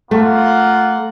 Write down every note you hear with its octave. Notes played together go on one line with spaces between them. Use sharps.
A3 A#3 F4 F#5